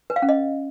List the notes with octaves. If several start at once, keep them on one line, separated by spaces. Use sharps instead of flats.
B4
F5
C#4
D#5